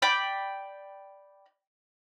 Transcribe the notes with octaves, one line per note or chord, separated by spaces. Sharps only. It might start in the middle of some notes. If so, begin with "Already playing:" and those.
D5 G5 B5